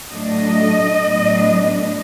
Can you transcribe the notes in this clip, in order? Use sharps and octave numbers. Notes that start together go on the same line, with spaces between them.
A2 F#3 A3 D4 D#5
A2 F#3 B3 D4